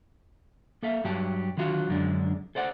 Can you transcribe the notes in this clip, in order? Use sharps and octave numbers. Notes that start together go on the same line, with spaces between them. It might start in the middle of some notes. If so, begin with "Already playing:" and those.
A#3 A4 E5 F5
G2 F#3 G4 A5
D3 D#3 F#3 F4 F#4
F#2 D3 G#3 D4
A4 C5 D5 F#5